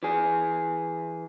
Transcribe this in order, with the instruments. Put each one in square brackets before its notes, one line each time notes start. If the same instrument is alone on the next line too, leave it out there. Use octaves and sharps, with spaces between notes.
[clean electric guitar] E3 G#4